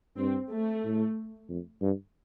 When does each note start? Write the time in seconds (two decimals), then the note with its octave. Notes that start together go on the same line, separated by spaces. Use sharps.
0.17 G2 C4
0.50 A3
0.84 A2
1.49 F2
1.82 G2